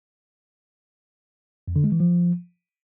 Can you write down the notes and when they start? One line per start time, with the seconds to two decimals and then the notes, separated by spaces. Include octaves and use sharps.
1.68 F2
1.76 D3
1.84 G#3
1.92 E3
2.00 F3